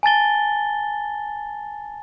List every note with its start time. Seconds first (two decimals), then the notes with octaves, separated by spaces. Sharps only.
0.03 G#5 A5 A6 G7